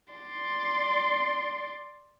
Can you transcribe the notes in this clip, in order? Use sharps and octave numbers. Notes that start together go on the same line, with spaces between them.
D5 C6